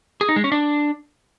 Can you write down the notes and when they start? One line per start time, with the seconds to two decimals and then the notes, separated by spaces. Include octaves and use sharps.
0.21 G#4
0.29 D#4
0.36 G#3
0.44 C#4
0.52 D4